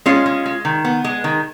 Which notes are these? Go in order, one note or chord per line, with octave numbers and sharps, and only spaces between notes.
G#3 C#4 F4
G#3
G#3
D#3
B3
G#3
D#3